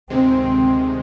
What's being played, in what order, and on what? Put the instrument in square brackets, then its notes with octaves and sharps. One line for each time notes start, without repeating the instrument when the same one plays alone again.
[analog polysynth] D2 C3 D#3 G#3 [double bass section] C4